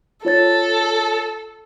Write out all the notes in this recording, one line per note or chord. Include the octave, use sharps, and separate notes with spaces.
F4 A4 C#5 A6